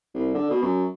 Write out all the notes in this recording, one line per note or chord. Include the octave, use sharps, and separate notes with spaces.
C2
D3
B2
F#2